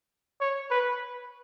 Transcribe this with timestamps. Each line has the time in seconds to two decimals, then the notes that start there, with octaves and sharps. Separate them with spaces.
0.41 C#5
0.71 B4